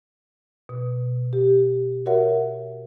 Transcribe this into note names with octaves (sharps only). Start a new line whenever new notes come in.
B2
G4
F#4 A#4 C#5 E5 F#5